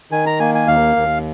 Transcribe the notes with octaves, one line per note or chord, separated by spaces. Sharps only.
D#3 G#5
A#5
A#3 G#5
G#5
D#2 F5
D#2